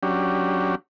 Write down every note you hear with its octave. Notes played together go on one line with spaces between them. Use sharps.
F#3 C#4 D4 G4